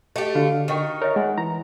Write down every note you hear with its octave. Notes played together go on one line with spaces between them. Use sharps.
A3 G4 D#5
D3 F#4 F5
D#3 G4 D#5 G5 C#6
A#4 C#5 D#5 E5
G#3 F#5 G#5
E3 E4 A#5